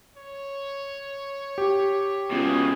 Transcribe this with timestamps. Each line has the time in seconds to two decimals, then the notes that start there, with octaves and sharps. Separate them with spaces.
0.17 C#5
1.58 G4
2.31 C#2 B2 G#4